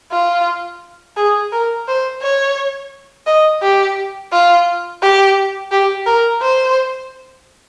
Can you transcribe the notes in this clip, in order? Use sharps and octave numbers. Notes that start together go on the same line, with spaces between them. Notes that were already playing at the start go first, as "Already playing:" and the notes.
F4
G#4
A#4
C5
C#5
D#5
G4
F4
G4
G4
A#4
C5